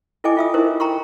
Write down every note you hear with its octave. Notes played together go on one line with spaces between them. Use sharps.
E4 A4 D#5 G5 G#5 D6
F4 E5 D#6
D#4 E4 G4 A#4 C5
G5 A#5 C6 C#6